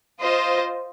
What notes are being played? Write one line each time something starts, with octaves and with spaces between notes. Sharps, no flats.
F4 C5 D#5